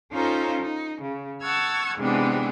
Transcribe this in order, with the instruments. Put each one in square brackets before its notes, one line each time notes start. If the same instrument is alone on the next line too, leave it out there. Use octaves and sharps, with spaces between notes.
[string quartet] C#4 D#4 F4 A4 C5 A#5
D#4
C#3
F#5 A5 C#6 E6 F6 G#6
G#2 C3 E3 B3 D4 G4